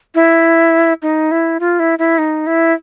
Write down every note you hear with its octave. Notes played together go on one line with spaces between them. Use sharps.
E4
D#4
E4
F4
E4
E4
D#4
E4